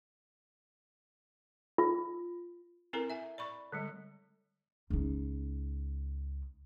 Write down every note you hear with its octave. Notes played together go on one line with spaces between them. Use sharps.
F4
C4 E4 A4 A#4 A#5
E5 G#5
D5 B5 C#6
D3 G3 G#3
C#2 D#4